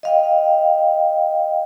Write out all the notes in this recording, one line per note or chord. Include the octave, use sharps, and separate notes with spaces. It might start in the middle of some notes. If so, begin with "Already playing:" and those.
D#5 F5 G5